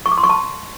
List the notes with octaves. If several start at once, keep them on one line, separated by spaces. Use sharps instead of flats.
C#6
D6
C6
C#6
A5